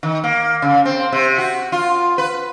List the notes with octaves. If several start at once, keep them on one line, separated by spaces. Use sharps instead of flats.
D#3
A#3
C#3
C4
C3
F#4
F4
B4